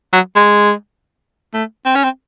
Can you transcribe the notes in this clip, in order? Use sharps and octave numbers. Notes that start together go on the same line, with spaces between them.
F#3
G#3
A3
C4
C#4
C4